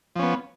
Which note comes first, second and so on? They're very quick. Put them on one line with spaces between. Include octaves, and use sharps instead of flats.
F3 C#4 B3